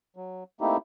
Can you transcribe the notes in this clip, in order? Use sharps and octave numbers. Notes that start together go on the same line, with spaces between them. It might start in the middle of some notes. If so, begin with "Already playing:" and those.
F#3
A3 A#3 C4 D#4 E4 G4